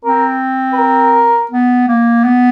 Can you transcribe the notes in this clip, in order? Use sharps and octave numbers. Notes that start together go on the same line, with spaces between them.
C4 A#4
B4
A#4
B3
A#3
B3